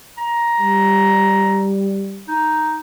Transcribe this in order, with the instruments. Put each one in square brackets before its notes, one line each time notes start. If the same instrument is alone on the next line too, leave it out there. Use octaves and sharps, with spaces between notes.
[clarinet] A#5
[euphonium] G3
[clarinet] D#4